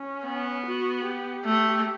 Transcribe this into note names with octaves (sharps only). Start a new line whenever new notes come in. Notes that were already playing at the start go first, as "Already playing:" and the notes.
Already playing: C#4
B3
F#4
G4
A3